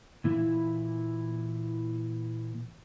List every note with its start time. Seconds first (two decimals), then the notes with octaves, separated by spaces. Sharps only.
0.24 A#2 E3 E4